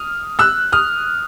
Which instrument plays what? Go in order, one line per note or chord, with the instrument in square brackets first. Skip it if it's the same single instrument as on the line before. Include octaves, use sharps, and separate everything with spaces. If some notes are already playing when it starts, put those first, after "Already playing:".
Already playing: [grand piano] D#6 F6
E6 F#6
D#6 F6